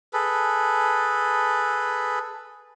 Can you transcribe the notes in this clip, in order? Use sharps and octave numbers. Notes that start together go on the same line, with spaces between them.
G#4 A4 B4